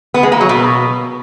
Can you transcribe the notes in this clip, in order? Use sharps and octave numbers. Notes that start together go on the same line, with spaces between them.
B3
G#3
A#3
F#3
B2